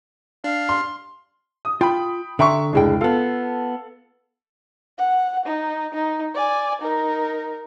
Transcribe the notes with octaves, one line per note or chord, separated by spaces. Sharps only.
D4 F5
C6
D#6
F4 G5 B5
D3 E5 G5 A#5 C6 C#6
F1 C#2 G#3 D4 E4 G5
B3 F4 A4 F5
F#5
D#4
D#4
D5 G#5
D#4 A#4